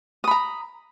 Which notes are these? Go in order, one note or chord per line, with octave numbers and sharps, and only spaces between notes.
A#5 B5 D#6